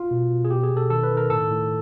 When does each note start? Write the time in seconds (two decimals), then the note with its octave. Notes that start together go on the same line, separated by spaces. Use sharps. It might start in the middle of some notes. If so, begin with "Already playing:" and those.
Already playing: F4
0.11 B2
0.31 B2
0.45 G#4
0.50 B2 G4
0.63 G#4
0.71 B2
0.77 A4
0.90 D#3 A4
1.03 B4
1.10 D#3
1.17 A#4
1.30 A2 A4
1.50 A2